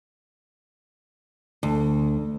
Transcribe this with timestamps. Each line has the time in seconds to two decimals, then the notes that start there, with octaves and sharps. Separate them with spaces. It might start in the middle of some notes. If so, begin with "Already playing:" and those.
1.63 D2